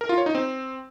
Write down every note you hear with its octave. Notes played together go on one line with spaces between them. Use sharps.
A#4
F4
C#5
D#4
C4